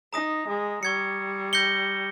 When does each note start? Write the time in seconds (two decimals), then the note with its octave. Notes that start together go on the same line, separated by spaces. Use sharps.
0.13 D#4 A#5 D#6 A#6
0.48 G#3
0.83 G3 C#6 G#6 C#7
1.53 G6 A#6 C#7 G7